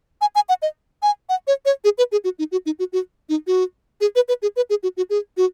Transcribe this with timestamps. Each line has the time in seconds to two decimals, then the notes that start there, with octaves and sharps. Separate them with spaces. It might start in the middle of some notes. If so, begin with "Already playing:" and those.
0.21 G#5
0.35 G#5
0.49 F#5
0.62 D#5
1.03 G#5
1.29 F#5
1.47 C#5
1.65 C#5
1.84 G#4
1.98 B4
2.12 G#4
2.24 F#4
2.39 D#4
2.52 F#4
2.66 D#4
2.79 F#4
2.93 F#4
3.29 D#4
3.47 F#4
4.01 G#4
4.16 B4
4.28 B4
4.42 G#4
4.56 B4
4.70 G#4
4.83 F#4
4.97 F#4
5.10 G#4
5.37 F#4